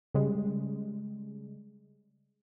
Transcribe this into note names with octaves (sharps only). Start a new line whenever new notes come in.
C#3 G3 G#3